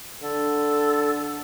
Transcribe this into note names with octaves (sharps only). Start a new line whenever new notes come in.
D3 A4